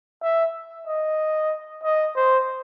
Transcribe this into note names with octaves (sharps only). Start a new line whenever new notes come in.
E5
D#5
D#5
C5